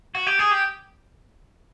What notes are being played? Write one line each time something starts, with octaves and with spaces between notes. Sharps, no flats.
F#4
G4
G#4
G4